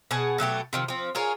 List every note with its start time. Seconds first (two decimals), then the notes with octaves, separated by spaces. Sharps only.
0.11 B2 G#4 F#5 A5
0.38 B2 F#3 A3 G4
0.73 C3 D#3 F3
0.88 F3 C4
1.15 F4 G#4 A#4 C#5